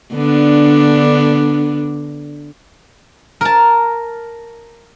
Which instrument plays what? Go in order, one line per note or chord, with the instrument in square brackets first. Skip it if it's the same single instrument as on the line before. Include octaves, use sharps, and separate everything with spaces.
[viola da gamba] D3 B3 D4
[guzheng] A#4 A5